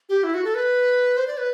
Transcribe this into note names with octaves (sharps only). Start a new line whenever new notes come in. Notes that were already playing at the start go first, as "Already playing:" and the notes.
G4
E4
F#4
A4
B4
C5
D5
B4